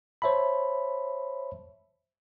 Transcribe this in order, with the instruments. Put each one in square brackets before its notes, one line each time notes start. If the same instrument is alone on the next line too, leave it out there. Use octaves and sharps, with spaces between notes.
[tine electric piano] C5 C#5 E5 A5 B5